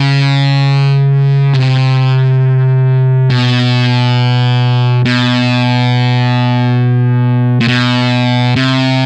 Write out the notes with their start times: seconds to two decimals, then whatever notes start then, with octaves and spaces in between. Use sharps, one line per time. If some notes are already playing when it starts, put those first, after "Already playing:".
Already playing: C#3
1.54 C3
3.30 B2
5.05 B2
7.60 A#2
7.68 B2
8.56 C3